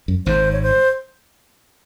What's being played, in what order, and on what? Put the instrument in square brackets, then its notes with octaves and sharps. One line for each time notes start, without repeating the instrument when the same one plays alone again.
[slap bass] F#2
[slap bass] G#1 G#2 [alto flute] C5
[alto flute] C#5
C5